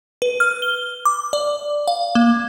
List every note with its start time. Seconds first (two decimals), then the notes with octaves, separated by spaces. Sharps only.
0.22 B4
0.40 F6
0.62 G7
1.05 D6
1.33 D5
1.88 F5
2.15 A#3